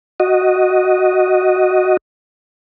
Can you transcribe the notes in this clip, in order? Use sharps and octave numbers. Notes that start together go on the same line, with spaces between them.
F#4 D#5